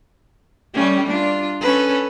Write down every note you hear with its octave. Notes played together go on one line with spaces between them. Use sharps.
G3 A3 C#4
D4 F4
C#4 A4 B4